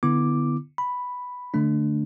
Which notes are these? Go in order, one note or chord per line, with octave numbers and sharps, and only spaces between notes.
D3 B3 E4 D6
B5
D3 A3 D4